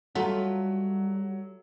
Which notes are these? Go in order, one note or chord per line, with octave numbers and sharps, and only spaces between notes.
F#3 G3 A3 F4 F#5 A#5